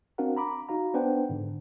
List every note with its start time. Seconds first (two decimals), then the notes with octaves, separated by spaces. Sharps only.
0.18 C4 D4 F#4 A#4 F5 F#5
0.37 A#5 B5 D6
0.69 D#4 F#4 F5 A#5
0.94 B3 D4 B4 C5 F#5 G5
1.29 G#2 D3